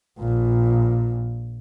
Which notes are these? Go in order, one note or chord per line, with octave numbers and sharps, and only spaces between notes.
A#1 A#2